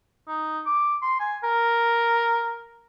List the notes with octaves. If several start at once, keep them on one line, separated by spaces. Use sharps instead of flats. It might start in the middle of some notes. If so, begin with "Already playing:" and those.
D#4
D6
C6
G#5
A#4